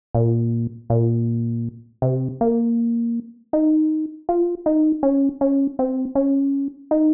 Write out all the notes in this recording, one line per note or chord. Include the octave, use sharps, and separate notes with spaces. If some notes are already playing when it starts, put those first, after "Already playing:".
A#2
A#2
C3
A#3
D#4
F4
D#4
C#4
C#4
C4
C#4
D#4